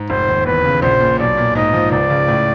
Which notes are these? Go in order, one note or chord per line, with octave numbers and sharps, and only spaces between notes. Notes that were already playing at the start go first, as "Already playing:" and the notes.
Already playing: G#2
F1 C5
D#2
E2 B4
C#3
A#1 C5
A#2
B1 D5
A#2
G#2 D#5
F3
C#2 D5
C#3
A2